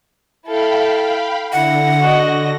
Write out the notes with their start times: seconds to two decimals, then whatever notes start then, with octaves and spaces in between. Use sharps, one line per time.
0.46 E4 A4 F5 G5 B5
1.53 D3 E4 F#5 A#6
2.01 F#4 D#5